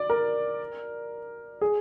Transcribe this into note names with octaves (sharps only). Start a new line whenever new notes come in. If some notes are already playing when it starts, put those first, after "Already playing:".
Already playing: D5
A#4
G#4